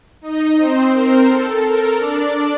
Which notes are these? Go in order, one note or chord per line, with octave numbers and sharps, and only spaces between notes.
D#4 D#5
C4 C5
A#4
A4
A#4
D4 D5